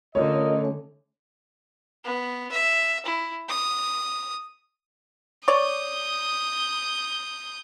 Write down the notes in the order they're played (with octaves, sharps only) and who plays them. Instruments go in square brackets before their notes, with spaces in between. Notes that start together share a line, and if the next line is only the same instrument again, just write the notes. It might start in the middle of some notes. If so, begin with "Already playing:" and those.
[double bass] D3 [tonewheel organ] A3 C#4 [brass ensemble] F4 A#4 D#5 [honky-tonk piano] C#5
[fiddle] B3
E5
E4
D#6
[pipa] C#5 D5 [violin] D#6 G6